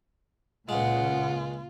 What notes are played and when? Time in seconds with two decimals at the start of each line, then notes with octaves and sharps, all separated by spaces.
0.69 C#2 A#2 C#3 G#3 F4 F#5